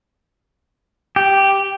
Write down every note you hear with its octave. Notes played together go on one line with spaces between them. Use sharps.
G4